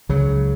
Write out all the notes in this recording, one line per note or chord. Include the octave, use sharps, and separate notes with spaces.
C#2 C#3 F#3